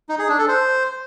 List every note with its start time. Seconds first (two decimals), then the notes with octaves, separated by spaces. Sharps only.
0.09 D#4
0.19 G#4
0.29 D4
0.38 A4
0.48 C5